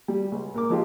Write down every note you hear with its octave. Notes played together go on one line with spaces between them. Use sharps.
G3
C#2
A#2 A#4 D6
F3 F#3 G#3 A#3 F4 G4